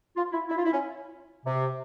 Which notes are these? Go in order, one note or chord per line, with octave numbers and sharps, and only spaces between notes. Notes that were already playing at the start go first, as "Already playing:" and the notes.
F4
E4
E4
F4
E4
C#4
C3